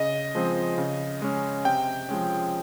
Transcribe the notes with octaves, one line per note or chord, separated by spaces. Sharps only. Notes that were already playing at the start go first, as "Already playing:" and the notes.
Already playing: C#3 D#5
F3 G#3 C4
C#3
G#3 C#4
C3 G5
F3 G#3 C#4